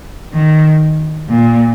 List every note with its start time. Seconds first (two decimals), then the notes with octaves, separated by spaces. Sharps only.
0.34 D#3
1.29 A#2